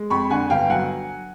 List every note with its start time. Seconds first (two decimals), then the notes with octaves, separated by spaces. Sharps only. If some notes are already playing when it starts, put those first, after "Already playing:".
Already playing: G#3
0.10 F2 B5 C#6
0.30 D3 F#5 G#5
0.50 G1 F5 G5
0.70 F#3 F#5 G#5